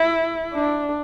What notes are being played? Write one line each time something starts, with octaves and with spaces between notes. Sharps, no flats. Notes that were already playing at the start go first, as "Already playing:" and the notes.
Already playing: E4
D4